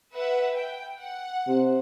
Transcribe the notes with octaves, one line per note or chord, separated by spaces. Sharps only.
B4 E5 F#5
G5
F#5
C3